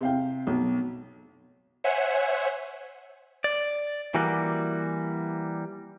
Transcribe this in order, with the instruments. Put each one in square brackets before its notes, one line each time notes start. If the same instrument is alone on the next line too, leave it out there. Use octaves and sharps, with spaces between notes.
[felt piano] C3 F5 G5
B1
[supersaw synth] C5 C#5 E5 F#5 G#5
[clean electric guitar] D5
E3 G3 A#3 F#4